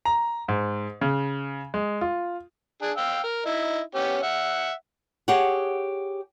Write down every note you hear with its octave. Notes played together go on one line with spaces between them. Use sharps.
A#5
G#2
C#3
G#3
F4
D4 G#4
F5 G5 E6
A#4
D#4 E4
B3 C#4 G4
E5 F#5
G4 G#4 C#5 F#5